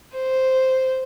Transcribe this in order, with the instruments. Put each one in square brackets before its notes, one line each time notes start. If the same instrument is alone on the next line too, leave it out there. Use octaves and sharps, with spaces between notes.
[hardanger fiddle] C5